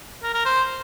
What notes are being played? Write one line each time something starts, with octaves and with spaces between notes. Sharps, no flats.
A#4
A#4
C5